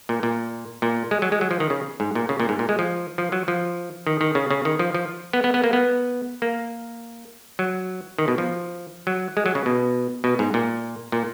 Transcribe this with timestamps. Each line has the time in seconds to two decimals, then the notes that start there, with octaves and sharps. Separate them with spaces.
0.09 A#2
0.23 A#2
0.82 A#2
1.11 G#3
1.22 F#3
1.32 G#3
1.41 F#3
1.51 F3
1.60 D#3
1.70 C#3
2.00 G#2
2.15 A#2
2.29 C#3
2.40 A#2
2.49 G#2
2.59 A#2
2.69 G#3
2.79 F3
3.18 F3
3.32 F#3
3.48 F3
4.07 D#3
4.21 D#3
4.35 C#3
4.51 C#3
4.65 D#3
4.79 F3
4.94 F3
5.33 B3
5.44 B3
5.54 B3
5.64 A#3
5.73 B3
6.42 A#3
7.59 F#3
8.18 D#3
8.28 B2
8.38 F3
9.07 F#3
9.37 G#3
9.46 F#3
9.55 C#3
9.66 B2
10.24 B2
10.39 G#2
10.54 A#2
11.12 A#2